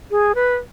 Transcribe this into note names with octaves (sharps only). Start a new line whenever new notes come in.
G#4
B4